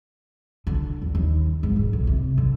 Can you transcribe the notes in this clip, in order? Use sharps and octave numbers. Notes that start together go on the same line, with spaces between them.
D3
E2
D#2
G#2
E1
B1
C3
D3